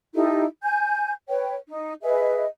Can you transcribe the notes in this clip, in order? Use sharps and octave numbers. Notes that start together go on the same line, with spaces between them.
D#4 E4 G4 A4
G#5 G6
B4 C#5 G5
D#4
G#4 B4 D#5 E5